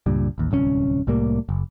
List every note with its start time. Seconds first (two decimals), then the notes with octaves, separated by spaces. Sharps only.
0.06 C#2 G2 A#2 G3
0.38 A1 D#2
0.51 D1 C2 A#2 C#4
1.07 C2 A2 G3 A#3
1.49 F#1